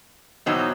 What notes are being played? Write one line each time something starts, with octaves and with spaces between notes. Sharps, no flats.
E2 B2 F#3 C4 D#4